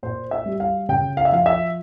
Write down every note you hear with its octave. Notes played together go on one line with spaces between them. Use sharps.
A#2 C5
E5
G3
F5
C#3 G5
F5
E5
F3 F5
E5